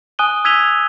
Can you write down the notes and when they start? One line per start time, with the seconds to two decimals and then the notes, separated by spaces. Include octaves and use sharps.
0.19 G#5 D#6 F#6 D#7 G7
0.45 E6 G#6 B6 D#7 F7 G7